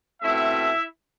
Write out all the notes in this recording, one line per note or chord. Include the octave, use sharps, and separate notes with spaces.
B2 A3 C4 E4 E5